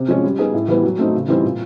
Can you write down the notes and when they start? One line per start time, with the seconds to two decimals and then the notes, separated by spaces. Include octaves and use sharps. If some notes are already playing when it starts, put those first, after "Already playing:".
Already playing: C3
0.08 F3 G#3 C#4
0.24 G3
0.39 B3 D#4 G#4
0.53 A2
0.68 E3 G3 B3
0.83 F#3
0.99 A3 C4 D#4
1.14 C#3
1.28 E3 G3 C4 D#4
1.43 A#2